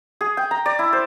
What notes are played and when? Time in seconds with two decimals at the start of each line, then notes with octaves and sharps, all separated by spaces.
0.21 G#4
0.37 G5
0.51 A#5
0.66 D5
0.79 E4
0.93 C5